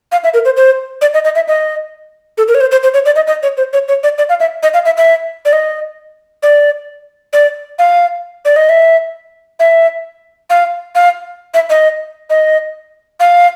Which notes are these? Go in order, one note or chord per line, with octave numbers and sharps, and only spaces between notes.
F5
E5
A#4
C5
C5
D5
D#5
D#5
E5
D#5
A4
A#4
C#5
C5
C5
C5
C#5
D5
D#5
D#5
C#5
C5
C#5
C#5
D5
D5
F5
E5
D#5
F5
E5
E5
D5
D#5
D5
D5
F5
D5
D#5
E5
E5
F5
F5
E5
D#5
D#5
F5